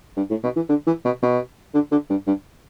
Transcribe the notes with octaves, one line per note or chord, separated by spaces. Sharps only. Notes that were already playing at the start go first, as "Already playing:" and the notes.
G2
A2
B2
E3
D3
E3
B2
B2
D3
D3
G2
G2